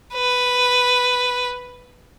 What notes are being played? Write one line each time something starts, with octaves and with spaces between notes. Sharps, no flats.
B4